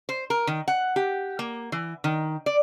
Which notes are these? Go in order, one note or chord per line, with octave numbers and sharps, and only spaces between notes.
C5
A#4
D#3
F#5
G4
A#3
E3
D#3
D5